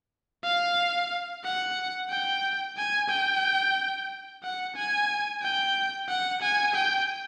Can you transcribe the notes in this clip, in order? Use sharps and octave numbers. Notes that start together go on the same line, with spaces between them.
F5
F#5
G5
G#5
G5
F#5
G#5
G5
F#5
G#5
G5